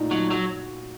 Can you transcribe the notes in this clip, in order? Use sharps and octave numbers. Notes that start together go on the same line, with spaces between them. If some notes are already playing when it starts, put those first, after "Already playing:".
Already playing: A#2 A3 D#4
F#3 D#4
F#3 F#4